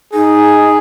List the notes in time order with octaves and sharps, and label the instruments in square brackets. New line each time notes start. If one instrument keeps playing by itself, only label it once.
[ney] D#4 [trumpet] G#4